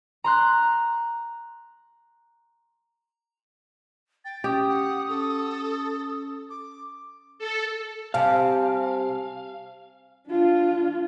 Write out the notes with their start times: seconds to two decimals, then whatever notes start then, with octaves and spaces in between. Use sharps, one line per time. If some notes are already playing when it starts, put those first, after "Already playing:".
0.24 A#5 C6 F#6
4.25 G5 A6
4.44 C#4 G4 D#6
4.69 F#5
5.09 C#4 A4
6.50 D6
7.39 A4
8.14 C3 G3 F5 G#5 A5
10.28 D4 F4